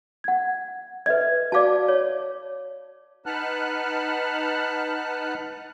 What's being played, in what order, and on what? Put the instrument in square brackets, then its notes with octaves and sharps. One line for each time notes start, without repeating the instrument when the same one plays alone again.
[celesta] F#5 G#6
[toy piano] B4 D#5 [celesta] E5 G#6
[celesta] F#4 D6 [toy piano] D5 F5 A5
[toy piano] C#5
[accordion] D#4 B4 F#5 A5 F6 F#6